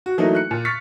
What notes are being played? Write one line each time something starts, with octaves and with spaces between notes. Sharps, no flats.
F#4
E3 F#3 A3 A#3 D#4
F#6 C#7
A#2
C#6 F6 A6 B6 C#7